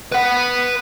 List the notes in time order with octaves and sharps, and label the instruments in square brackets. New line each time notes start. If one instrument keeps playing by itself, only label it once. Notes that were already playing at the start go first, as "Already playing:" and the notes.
[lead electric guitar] B4 F#5